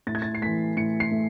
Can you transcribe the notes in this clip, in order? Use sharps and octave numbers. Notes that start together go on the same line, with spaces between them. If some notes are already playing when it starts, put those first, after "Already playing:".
A2 A6
G#6
A6
C7
E3 A3 B6
A2 C#7
C7
A3